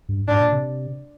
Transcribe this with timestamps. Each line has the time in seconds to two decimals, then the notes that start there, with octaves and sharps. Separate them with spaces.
0.09 G2
0.28 G#2 D4
0.40 A#2
0.52 C3